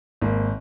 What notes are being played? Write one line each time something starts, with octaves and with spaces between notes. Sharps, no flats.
G#1 A#3